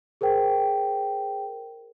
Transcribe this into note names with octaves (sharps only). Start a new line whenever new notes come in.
G#4 A#4 C5 G5